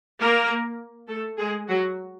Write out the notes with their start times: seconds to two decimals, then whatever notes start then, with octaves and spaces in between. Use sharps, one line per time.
0.20 A#3 A#4
1.08 A3 A4
1.38 G#3 G#4
1.68 F#3 F#4